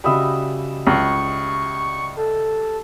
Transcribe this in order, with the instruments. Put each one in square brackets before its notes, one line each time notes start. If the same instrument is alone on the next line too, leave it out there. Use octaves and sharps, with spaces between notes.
[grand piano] C#3 F#4 B5 [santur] G3 D#5 E5
[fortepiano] C#2 [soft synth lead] C#6
[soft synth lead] A4